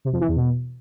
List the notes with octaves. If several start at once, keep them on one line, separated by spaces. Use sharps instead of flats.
C3
F2
E3
E2
B2